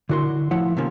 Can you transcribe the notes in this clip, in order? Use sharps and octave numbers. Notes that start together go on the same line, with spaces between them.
D3 E4 F#4 A#4 C6
A2 F3 E4 F#5
C3 D#3 F3 A#3 C#4